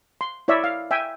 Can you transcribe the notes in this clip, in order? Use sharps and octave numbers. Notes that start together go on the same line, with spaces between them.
C6
E4 C#5 D5 E5
F5
E5 G5 G#5